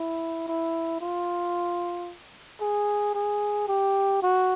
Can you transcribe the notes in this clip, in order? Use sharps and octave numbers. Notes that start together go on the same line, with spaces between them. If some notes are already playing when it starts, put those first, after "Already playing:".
Already playing: E4
E4
F4
G#4
G#4
G4
F#4